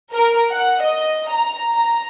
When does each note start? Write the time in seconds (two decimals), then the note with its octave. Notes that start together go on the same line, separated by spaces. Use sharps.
0.13 A#4
0.51 F#5
0.83 D#5
1.30 A#5
1.72 A#5